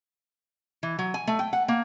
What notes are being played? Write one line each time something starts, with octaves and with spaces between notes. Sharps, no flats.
E3
F#3
G#5
A3
G5
F#5
A#3